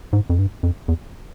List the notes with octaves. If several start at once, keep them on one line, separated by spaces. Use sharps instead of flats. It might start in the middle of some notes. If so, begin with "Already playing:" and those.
G#2
F2
G2
F2
E2